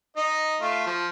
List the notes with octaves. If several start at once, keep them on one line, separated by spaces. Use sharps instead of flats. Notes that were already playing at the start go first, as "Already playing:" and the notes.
D#4 D#5
A3 F4
F3